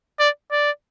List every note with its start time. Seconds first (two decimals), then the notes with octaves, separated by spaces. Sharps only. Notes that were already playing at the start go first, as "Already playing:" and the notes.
0.20 D5
0.52 D5